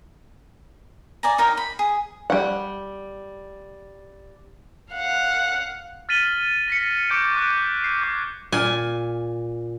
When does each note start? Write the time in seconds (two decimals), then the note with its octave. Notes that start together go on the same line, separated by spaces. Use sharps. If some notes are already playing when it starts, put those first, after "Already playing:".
1.23 D5 G#5 A#5
1.38 D#4 A#4 C#5 G5
1.57 B5
1.79 G#4
2.30 G3 F#5
4.92 F5 F#5
6.09 F6 A6 B6 D#7 F#7 G7
6.68 A#6 B6 C#7
7.10 C#6 D6 F#6 G6 C#7 D7
7.35 D6 F#6 D7
7.84 C7
8.01 D6 G#6
8.52 A#2 G#5